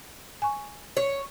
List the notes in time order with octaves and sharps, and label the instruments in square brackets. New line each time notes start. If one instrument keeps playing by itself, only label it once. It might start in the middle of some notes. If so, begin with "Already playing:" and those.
[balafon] G#5 C#6
[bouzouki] C#5